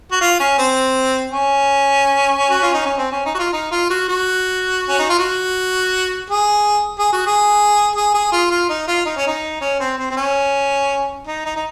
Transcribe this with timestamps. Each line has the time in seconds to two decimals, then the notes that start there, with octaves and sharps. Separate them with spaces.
0.11 F#4
0.21 F4
0.40 C#4
0.58 C4
1.32 C#4
2.50 F#4
2.63 F4
2.74 D#4
2.86 C#4
2.98 C4
3.12 C#4
3.25 D#4
3.35 F#4
3.39 F4
3.53 D#4
3.71 F4
3.90 F#4
4.08 F#4
4.89 C#4
4.99 D#4
5.09 F4
5.19 F#4
6.30 G#4
6.98 G#4
7.12 F#4
7.26 G#4
7.96 G#4
8.14 G#4
8.32 F4
8.51 F4
8.69 D#4
8.88 F4
9.06 D#4
9.17 C#4
9.27 D#4
9.61 C#4
9.80 C4
9.98 C4
10.10 C4
10.17 C#4
11.27 D#4
11.45 D#4
11.56 D#4